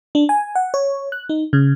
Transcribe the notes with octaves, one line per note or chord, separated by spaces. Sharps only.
D4
G#5
F#5
C#5
F#6
D#4
C#3